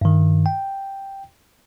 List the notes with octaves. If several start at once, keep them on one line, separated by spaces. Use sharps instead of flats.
G2 D#3
G5